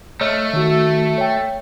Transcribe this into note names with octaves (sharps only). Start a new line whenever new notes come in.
A3 C#5 D#5 F6
D#3 F#4
C#5 G5